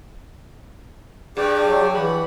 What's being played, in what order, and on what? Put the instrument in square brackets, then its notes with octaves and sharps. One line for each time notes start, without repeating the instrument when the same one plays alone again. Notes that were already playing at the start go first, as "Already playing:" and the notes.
[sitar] G2 [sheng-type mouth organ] G4 D5 [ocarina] G#4
[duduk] F#3
[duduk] E3 [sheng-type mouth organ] F#5 B5